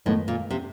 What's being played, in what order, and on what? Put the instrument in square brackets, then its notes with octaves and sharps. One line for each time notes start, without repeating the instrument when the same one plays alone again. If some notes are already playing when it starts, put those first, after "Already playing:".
[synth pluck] F#2 D#3 G#3 B3 [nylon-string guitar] A2
[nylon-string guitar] A#2
C3